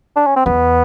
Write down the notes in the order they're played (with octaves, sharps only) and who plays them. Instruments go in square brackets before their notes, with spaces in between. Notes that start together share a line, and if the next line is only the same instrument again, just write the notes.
[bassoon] D4
C#4
C4
[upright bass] E2 [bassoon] B3